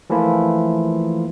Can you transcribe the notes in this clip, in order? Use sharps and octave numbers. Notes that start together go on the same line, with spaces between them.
E3 F3 A3 A#3 E4 F4